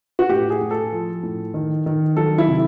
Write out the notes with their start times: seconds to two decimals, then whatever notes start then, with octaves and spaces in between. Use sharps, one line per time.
0.19 F#4
0.30 A2 G4
0.50 G#4
0.61 A2
0.71 A4
0.92 F3
1.23 A2
1.54 D#3
1.86 D#3
2.17 F#3 A4
2.38 E4
2.48 C3